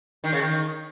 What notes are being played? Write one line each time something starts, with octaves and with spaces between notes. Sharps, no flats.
D#3
C#3
D#3